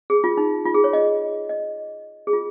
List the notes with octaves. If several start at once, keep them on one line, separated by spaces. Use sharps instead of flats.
G#4
F4
D#4
F4
G#4
C#5
D#5
D#5
G#4
F4